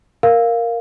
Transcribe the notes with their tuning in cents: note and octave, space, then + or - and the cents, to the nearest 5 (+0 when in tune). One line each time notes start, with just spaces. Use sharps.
A#4 +0 F5 +0